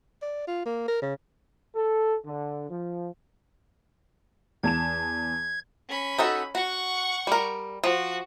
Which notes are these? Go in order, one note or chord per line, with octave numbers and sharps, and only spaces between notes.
D5
F4
A#3
A#4
C#3
A4
D3
F3
E2 A5 G#6 E7
C#4 B5
D#4 F#4 A4
F#4 F#5 C#6
G3 A#4
F3 F#4